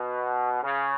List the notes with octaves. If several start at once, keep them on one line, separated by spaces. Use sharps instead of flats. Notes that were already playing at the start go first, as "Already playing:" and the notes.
Already playing: B2
C#3